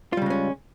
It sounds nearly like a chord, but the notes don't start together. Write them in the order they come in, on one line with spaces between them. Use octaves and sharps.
F4 G3 C#3 G#3 C#4